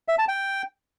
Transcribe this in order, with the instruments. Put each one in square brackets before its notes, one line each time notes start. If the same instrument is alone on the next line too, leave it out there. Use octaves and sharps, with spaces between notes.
[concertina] E5
A5
G5